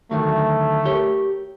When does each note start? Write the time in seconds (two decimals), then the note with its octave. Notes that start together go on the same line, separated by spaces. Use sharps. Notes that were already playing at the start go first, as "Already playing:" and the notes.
0.11 D2 D#3 F#3 A3
0.85 G4 A#4 C#5